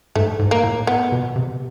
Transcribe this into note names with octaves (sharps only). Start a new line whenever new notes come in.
G#2 A3
G#2
A#3
A2
B3
B2
C3